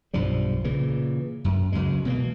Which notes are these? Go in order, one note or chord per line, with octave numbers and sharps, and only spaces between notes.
B1 G2 F3 G3
A#2 C#3 E3
F#2
C#2 G2 F#3 G#3
B2 E3 F3 A#3